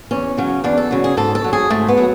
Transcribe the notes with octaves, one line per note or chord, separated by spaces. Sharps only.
E2 C#4
C#3 F#3
E2 D4
A4
C#3 F#3
G#4
G#2 A4
A4
F#3
G#4
G#2 A3
B3
F#3